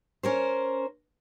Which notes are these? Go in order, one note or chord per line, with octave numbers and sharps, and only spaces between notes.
C#4 A#4 C5